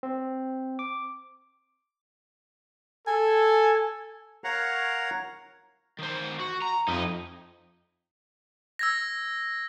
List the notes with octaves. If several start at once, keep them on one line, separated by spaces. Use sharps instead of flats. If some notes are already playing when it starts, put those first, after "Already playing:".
C4
D6
A4 G#5
A#4 C#5 F5 F#5 A#5
D#3 C5
F#4
A#5
F2 D#4 E4 D#5
E6 G#6 A#6